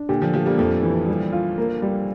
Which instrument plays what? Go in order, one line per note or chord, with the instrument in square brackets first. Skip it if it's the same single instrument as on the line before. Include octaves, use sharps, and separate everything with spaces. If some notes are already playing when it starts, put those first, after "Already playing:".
Already playing: [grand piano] D4
[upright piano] A#2 D3 [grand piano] G4
[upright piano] D3 F3
[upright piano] F3 A3 [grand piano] G4
[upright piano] G3 A#3
[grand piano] F2 [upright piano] F3 A3
[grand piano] E3
G3
F4
A#3
G3